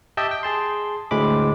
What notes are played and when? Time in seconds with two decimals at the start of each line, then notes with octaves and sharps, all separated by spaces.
0.17 G4 D#5 E5 G5 A5
0.31 G5
0.43 G#4 A5 C6
1.11 D2 A2 G#3 B5 D6